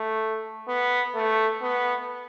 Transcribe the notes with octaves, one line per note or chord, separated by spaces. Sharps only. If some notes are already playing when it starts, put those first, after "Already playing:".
Already playing: A3
B3
A3
B3